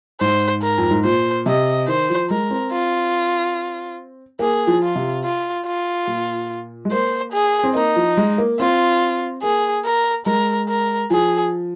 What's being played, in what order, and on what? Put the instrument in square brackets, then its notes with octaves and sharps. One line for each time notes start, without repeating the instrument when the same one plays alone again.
[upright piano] G#2 [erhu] C5
[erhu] A#4
[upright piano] F2
G#2
[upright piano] A#2 [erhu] C5
[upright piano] C3 [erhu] D#5
[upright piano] D#3 [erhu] C5
[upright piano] F3
[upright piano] G#3 [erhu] A#4
[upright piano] C4
[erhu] F4
[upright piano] A#3 [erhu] G#4
[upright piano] F3
[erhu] F4
[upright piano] C3
[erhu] F4
F4
[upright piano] A#2
G#3
[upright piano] A#3 [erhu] C5
[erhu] G#4
[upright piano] C4
[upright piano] A#3 [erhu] D#4
[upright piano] F3
G#3
A#3
[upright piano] C4 [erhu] F4
[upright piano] A#3 [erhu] G#4
[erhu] A#4
[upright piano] G#3 [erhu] A#4
[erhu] A#4
[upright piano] F3 [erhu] G#4